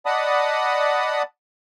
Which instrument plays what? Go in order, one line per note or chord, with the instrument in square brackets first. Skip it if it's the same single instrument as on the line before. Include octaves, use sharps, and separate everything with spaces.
[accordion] D5 D#5 F#5 A5 B5 D#6